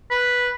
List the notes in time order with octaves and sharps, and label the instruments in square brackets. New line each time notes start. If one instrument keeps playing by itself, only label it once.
[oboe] B4